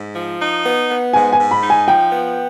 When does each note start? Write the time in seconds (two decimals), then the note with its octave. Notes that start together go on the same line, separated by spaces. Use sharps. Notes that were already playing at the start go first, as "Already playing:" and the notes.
Already playing: G#2
0.16 F3
0.41 D#4
0.65 B3
0.90 B3
1.13 G#2 G#5
1.33 G#5
1.39 G#2
1.51 B5
1.63 D#4
1.70 G#5
1.88 F3 G5
2.12 B3